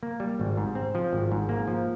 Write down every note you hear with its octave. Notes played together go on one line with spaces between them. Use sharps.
A#3
G3
G#1
G#2
C4
F3
G#1
G#2
A#3
F3